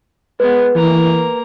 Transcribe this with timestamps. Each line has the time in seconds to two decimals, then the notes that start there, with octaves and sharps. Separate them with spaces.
0.40 G#3 B3 B4
0.75 E3 A#3 A#5